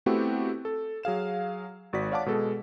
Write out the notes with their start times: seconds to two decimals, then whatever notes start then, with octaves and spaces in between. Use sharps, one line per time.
0.06 A3 B3 C4 E4 F#4 G4
0.65 A4
1.03 F#3 G#4 F5 E7
1.93 G#1 F#4 D5 B6
2.11 C#5 D5 F5 F#5 A5 D6
2.26 B2 G#3 A4